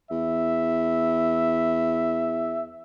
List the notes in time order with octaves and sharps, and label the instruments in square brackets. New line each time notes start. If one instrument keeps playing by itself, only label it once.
[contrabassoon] E2 [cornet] E5